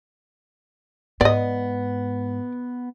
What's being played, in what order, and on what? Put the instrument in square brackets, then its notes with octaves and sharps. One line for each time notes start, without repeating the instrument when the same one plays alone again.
[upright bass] G#2 [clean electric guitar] B3 [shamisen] D5 D#5